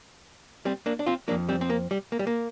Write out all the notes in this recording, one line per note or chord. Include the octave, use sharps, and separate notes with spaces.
G3 C4
A#3 D4
D4
C4 F4
F2 F3 A#3 D4
G3 C4
C4
A#3
G3
A#3
G3
A#3